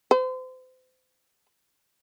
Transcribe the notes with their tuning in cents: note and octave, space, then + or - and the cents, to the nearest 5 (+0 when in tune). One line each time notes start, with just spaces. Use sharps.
C5 -35